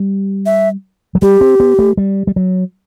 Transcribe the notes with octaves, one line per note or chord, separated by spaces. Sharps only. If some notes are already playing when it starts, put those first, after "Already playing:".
Already playing: G3
E5
F#3
G3 G4
C4
B3
A3
G3
G3
F#3